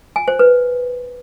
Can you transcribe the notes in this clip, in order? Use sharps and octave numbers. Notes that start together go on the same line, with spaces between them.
G#5
C5
B4